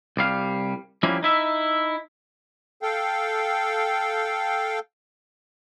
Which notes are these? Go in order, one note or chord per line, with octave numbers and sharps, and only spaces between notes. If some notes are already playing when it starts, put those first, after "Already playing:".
C2 G3 F5
F3 G3 A#3 C#4 E4
D#4 E4 E5
A4 F5 G5